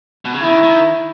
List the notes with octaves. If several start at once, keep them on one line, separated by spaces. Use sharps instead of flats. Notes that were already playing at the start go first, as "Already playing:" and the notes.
B2
C#3
D#3 E4
D#3